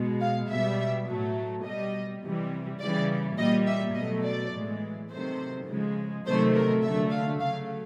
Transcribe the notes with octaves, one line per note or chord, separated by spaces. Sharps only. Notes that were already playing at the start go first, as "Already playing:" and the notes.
Already playing: B2 G#3
F5
B2 G3 E5
A2 F#3 A3
B2 G3 D#5
C3 E3 G3
C#3 E3 G3 D5
A#2 G3 D#5
E5
B2 F#3 A3 D#5
D5
A2 E3 G#3
C3 D#3 F#3 A3 C5
C#3 F3 G#3
C3 D#3 F#3 A3 C5
A#4
D3 F#3 A3 E5
F5
C#3 F#3 A3 F5